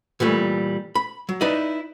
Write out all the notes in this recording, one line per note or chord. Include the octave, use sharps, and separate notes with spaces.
A#2 E3 G3 A3
B5
F#3
D#4 E4 B4 D5 D#5